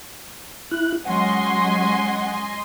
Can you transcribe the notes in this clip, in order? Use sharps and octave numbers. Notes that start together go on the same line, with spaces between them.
E4 F#6
F#3 G#3 C#4 D#5 F#5 G#5 C6